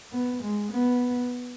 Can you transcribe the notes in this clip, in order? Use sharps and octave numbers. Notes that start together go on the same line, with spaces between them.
B3
G#3
B3